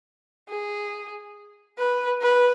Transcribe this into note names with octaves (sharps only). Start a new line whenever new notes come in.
G#4
B4
B4